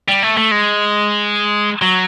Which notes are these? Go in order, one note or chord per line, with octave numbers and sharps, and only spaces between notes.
G3
A3
A3
G#3
F#3